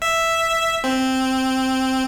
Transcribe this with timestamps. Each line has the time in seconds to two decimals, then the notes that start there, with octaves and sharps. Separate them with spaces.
0.02 E5
0.84 C4